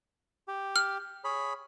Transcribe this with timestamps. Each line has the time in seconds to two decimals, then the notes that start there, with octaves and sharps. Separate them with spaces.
0.48 G4
0.76 F6
1.24 G#4 C#5 B5